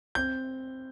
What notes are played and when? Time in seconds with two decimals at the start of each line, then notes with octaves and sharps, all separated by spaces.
0.15 C4 G6